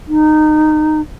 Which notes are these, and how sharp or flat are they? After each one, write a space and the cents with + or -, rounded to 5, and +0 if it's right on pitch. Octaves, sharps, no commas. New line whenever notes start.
D#4 -20